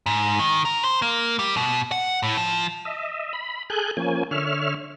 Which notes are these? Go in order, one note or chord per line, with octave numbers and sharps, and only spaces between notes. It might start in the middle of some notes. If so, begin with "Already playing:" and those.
G#2
D#3
A#4
C5
A#3
G3
B2
F#5
A2
F3
D#5 E5
B5
G#4 A4 G#5 F#6 G6
F3 A#3 C#4 G#5
D3 C#5 E5 F6